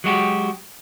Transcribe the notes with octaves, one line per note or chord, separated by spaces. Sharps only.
F#3 G#3 F#4 G4